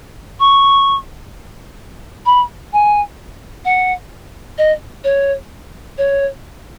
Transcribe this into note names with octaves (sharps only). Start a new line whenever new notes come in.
C#6
B5
G#5
F#5
D#5
C#5
C#5